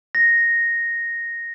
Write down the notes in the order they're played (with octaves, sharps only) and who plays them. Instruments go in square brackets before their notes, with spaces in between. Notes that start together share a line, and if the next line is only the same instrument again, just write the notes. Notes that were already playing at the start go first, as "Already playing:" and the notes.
[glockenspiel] A#6